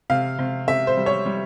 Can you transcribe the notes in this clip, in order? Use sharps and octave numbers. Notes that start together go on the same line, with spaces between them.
C3 F5
C3
C3 E5
C5
G3
C#5
G3